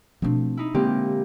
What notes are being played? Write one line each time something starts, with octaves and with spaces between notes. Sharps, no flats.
B2 F3 A3 C4 D4
D#4 E4
A#2 D3 G#3 A#3 C4 G4